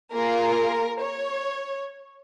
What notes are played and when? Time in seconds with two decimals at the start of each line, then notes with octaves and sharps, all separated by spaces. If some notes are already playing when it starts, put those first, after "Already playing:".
0.12 A#3 F4 G#4 A#4
1.00 C#5